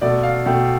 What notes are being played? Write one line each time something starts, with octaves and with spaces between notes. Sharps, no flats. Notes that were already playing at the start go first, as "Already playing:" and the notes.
B2 A3 D5
F5
B2 A3 G5